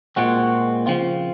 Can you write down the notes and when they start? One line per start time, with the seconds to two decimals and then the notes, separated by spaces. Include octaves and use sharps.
0.16 A#2 G#3 C4 F#4
0.86 C#3 F3 C4 F4